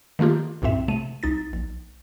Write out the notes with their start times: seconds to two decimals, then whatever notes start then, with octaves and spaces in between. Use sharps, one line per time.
0.19 D#3 A3 A#3 F4 G4
0.62 B1 F#2 A2 C4 E5
0.88 C3 A3 D#7
1.23 C2 D#4 A6
1.53 A#1